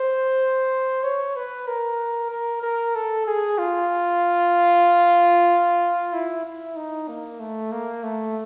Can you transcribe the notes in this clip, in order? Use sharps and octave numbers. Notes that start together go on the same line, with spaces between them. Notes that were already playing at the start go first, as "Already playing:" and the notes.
Already playing: C5
C#5
B4
A#4
A#4
A#4
A4
G#4
F4
E4
E4
D#4
A#3
A3
A#3
A3